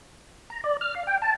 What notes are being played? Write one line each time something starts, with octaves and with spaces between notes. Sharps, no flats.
A#5
D5
F6
F5
G5
A5